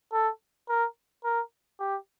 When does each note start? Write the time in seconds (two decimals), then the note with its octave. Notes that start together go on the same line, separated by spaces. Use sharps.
0.13 A4
0.69 A#4
1.24 A#4
1.80 G4